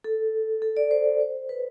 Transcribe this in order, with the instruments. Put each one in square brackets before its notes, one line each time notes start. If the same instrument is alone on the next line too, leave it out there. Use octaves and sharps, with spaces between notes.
[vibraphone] A4
A4
D5
C5
C5
B4